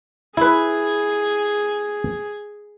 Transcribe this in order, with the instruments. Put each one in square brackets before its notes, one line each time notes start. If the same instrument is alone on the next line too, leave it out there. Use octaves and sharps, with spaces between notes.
[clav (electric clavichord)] E4 B4 [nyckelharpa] G#4